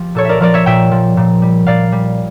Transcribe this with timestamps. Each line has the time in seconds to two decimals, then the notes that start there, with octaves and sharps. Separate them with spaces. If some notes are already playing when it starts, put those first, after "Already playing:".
Already playing: F3 G4
0.15 A#2 A4 C#5
0.25 A#4 D5 E5
0.40 F3 A#4 D5
0.54 C#5 E5
0.66 A#2 E5 G5
0.91 F3
1.17 A#2
1.42 G3
1.67 A#2 D5 F5
1.92 G3